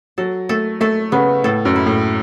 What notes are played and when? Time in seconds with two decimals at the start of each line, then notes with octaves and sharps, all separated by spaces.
0.18 F#3 A4
0.49 A3 A4
0.81 A3 A4
1.12 C#3 B3
1.44 A2 A4
1.65 F#2
1.76 E4
1.86 A2